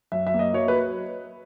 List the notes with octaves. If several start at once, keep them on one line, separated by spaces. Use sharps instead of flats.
F#2 E5
E5
A#3
D#5
F#3 C#5
B4
F#3